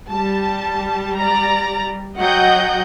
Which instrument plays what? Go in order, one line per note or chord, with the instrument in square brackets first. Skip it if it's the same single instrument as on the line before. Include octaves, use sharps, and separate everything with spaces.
[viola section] G3 [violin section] A5
[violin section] D5 A#5
[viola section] F#3 D#5 G5 [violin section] F#5 G6